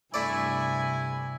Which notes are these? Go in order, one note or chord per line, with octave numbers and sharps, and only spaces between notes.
G2 C3 A3 E4 D5 G#5